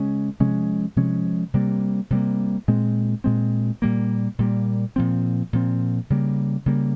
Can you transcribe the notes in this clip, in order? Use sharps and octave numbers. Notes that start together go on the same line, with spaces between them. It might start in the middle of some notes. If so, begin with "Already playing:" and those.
Already playing: C#3 G#3 C#4
C3 F3 G#3 C#4
C3 F3 G#3 C#4
C3 G3 A#3
C3 G3 A#3
A#2 G#3 C4
A#2 G#3 C4
A#2 G3 A#3
A#2 G3 A#3
A#2 F3 C4
A#2 F3 C4
C#3 G3 A#3
C#3 G3 A#3